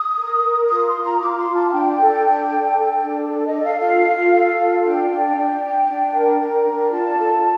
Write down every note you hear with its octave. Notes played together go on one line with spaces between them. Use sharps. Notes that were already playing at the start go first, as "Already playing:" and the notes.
Already playing: D#6
A#4
A#4
F4 D#6
C6
F4
A#5
F4 D6
C6
F4
A5
F5
D4 G5
A4
D4
A4
A4
D4
A4
D#5
A4
F5
F4 F5
F4
A4
F4
D4 G5
D4
D4
D4
D4
A#4
A#4
D4
F4 A5
A4